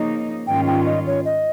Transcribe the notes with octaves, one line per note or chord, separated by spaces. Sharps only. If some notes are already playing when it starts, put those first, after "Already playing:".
Already playing: C#3 F3 A#3 D#4
G#2 D#3 G3 C#4 F4 G5
G5
D#5
C#5
D#5